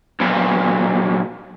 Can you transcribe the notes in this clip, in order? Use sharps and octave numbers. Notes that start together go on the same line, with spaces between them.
B1 A#2